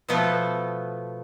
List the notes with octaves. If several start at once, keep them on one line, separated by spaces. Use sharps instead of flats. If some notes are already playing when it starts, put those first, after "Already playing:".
B2 F3 A3 B3 A4